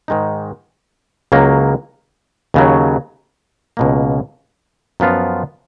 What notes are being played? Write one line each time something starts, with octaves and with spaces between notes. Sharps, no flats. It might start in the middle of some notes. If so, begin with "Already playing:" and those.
G#2 D#3 G#3 D#4
C#2 C#3 F#3 A#3
D#2 C#3 F#3
C#2 B2 A#3
F#2 F3 B3 F4